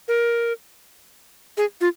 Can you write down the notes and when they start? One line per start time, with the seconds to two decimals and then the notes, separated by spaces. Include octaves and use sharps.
0.08 A#4
1.57 G#4
1.81 F4